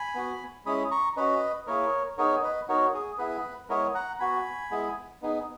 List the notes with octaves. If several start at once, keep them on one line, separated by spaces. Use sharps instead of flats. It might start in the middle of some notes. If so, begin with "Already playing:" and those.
Already playing: G#5 B5
B3 F#4
G#3 C#4 E4 B5 D#6
A#5 C#6
C#4 F#4 B4 D#5
A#3 E4 G#4 A#4 C#5
B3 D#4 G#4 A#4 C#5
B4 D#5
B3 D#4 F#4 A#4 C#5
G#4
B3 E4 G#4 B4
G#3 B3 E4 G#4 A#4 C#5
F#5 A#5
B3 F#4 G#5 B5
G#3 B3 E4 G#4
B3 D#4 G#4